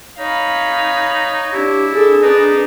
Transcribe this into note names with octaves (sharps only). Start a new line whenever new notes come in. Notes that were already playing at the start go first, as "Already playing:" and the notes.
D#4 C#5 F5 B5
D4 E4 G4
D4 G#4 A4
D4 D#4 B4